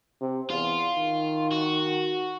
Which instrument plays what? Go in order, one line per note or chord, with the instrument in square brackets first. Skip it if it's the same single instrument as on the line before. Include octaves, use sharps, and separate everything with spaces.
[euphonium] C3
[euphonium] E2 [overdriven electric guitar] F4
[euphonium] D#3
[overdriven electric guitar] F#4